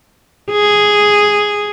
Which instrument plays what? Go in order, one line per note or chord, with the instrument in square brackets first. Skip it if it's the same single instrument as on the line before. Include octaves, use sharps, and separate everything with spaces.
[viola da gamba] G#4